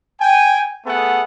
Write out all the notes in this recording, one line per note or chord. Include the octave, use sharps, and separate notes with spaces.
G5 G#5
A3 B3 G#4 A4 F#5